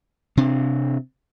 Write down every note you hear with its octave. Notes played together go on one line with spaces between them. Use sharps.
C3 C4 D4